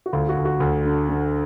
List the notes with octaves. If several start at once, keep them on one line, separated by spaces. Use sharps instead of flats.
F#4
D2 F4
F#4
D2
F#4
D2
D3
D3